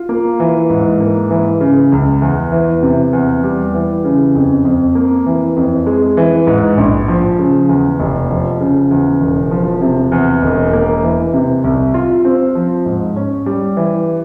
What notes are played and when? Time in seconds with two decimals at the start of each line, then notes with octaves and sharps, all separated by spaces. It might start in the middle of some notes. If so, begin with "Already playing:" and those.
Already playing: F4
0.09 A#3
0.40 E3
0.70 G#2
1.00 A#3
1.31 E3
1.61 C#3
1.92 C#2
2.22 E2
2.52 E3
2.82 C3
3.13 E2
3.44 G3
3.74 E3
4.04 C#3
4.35 F2
4.65 F2
4.95 A#3
5.26 E3
5.56 F2
5.86 G#3
6.17 E3
6.47 G#2
6.77 A#1
7.08 F3
7.39 C#3
7.69 E2
7.99 F1
8.30 F3
8.60 C#3
8.91 E2
9.21 E1
9.51 F3
9.82 C3
10.12 E2
10.42 E1
10.73 A#3
11.03 E3
11.34 C3
11.64 C2
11.94 F4
12.25 C4
12.55 F3
12.86 G#2
13.16 C#4
13.46 G3
13.77 E3